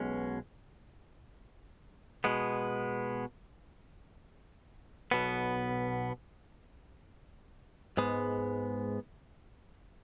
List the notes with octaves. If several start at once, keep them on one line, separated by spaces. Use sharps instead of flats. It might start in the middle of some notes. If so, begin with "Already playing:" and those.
Already playing: B1 B2 G#3 C#4
B2 G#3 B3
B1 B2 B3
G#2 G#3 B3